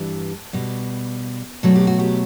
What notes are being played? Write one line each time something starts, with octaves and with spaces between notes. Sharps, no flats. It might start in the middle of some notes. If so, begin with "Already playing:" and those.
Already playing: G2 E3 G3 A4
B2 G3
B2 F#3 A3 A4
G4
F#4
G4